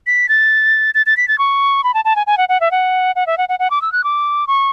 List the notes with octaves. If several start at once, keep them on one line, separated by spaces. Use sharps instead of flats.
B6
A6
A6
A6
B6
A6
C#6
B5
A5
A5
G#5
G#5
F#5
F#5
E5
F#5
F#5
E5
F#5
F#5
F#5
D6
E6
F#6
D6
C#6